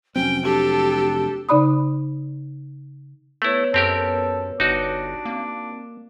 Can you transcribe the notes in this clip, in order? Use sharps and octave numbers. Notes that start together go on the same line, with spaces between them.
F1 F#3 C4 C#4 G5
D4 G4 A4
C#3 D#4 D5 B5 D#6
A3 B3 E4 B4 C#5
F#2 C4 G4 A4 A#4
G1 D4 D#4 F#4
A#3 C4